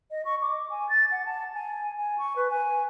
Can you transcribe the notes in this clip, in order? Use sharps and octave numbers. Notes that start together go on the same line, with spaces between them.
D#5
C#6
D6
G#5
A6
F#5
A5
G#5
G#5
C#6
B4
G#5